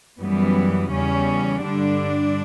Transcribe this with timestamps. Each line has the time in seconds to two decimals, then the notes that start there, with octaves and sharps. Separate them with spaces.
0.20 F#2 E3 G3 B3
0.91 E2 C#3 G3 C#4
1.63 G2 D3 G3 D4